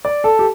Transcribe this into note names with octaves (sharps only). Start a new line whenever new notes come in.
D5
A4
G4